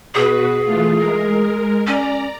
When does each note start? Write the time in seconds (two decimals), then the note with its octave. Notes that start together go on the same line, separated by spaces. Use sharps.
0.14 B2 F#4 G#4 B4
0.65 E3 A3 F4
0.97 G#3 A#4
1.87 C#4 D5 A#5